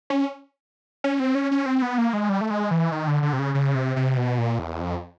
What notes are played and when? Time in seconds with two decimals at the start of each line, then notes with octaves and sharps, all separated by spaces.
0.10 C#4
1.04 C#4
1.20 C4
1.35 C#4
1.51 C#4
1.66 C4
1.82 B3
1.98 A#3
2.13 G#3
2.29 G3
2.41 A3
2.51 G#3
2.71 E3
2.92 D#3
3.07 D3
3.22 D3
3.33 C3
3.39 C#3
3.54 C#3
3.75 C3
3.96 C3
4.17 B2
4.38 A#2
4.59 E2
4.80 F2